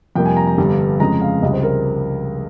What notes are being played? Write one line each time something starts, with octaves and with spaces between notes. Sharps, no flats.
F2 C3 G3 A#3 G5
G#5
A#5
A#5
G1 G2 G3
F2 C#3 G#3 A#5
F5
C#2 C3 G3 D#5
C5
A#4